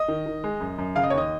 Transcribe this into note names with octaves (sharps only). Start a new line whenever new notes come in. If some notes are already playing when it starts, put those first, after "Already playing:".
Already playing: D#5
D#3
D#3
G#3
F#2
F#2
C#3 F5
D#5
C#5
D#2 D#5